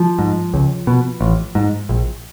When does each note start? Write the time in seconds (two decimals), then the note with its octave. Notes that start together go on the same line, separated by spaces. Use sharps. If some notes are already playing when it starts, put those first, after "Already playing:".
Already playing: F3
0.19 G#2
0.54 C#2
0.87 B2
1.21 A1
1.55 G#2
1.89 A#1